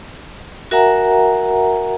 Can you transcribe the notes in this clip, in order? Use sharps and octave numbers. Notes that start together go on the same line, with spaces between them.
F#4 A#4 E5 F#5 G#5 A#5